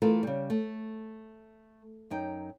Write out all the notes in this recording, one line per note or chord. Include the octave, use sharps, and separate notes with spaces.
E3 A3 F4 A4 A#4
C#3 G3
A3
F#2 D#4 G5